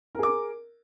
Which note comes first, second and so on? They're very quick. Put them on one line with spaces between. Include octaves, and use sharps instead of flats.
A#4 G#4 D6